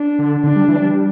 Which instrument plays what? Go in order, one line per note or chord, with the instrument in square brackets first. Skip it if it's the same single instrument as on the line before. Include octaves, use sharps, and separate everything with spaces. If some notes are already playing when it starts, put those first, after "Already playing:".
Already playing: [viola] D4
[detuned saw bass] D3
[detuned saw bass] D3 [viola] D4
[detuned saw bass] G3
E3
G3